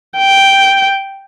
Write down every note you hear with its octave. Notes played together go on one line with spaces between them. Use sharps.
G5